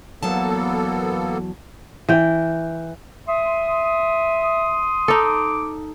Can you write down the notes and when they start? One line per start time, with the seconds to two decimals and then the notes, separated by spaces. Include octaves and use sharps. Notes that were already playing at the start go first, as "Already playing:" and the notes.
0.23 E2 F#3 A#3 B3 A4 A5
2.09 E3 G5
3.28 E5 C6 D#6
5.08 D#4 A4 D6